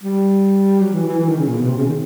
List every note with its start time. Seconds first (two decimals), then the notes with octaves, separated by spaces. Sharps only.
0.03 G3
0.81 F#3
0.93 E3
1.07 E3
1.20 E3
1.28 D#3
1.38 C#3
1.48 A#2
1.58 B2
1.68 C3
1.77 C#3
1.87 D#3